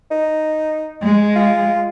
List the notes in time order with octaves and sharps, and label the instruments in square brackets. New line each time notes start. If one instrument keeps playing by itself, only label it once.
[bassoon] D#4
[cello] G#3
[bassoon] F4